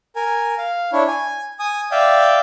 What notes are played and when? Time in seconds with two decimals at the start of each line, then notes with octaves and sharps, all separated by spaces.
0.16 A#4 G#5
0.58 F5
0.93 D4 E4 C#5
1.08 G#5
1.59 G#5 D#6
1.91 D5 E5 F5 G5